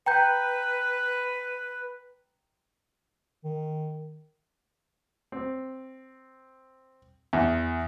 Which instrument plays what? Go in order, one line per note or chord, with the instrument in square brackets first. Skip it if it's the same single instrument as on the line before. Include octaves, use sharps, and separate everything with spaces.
[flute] B4 [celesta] G5 A#5 G6
[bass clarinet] D#3
[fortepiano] C4
E2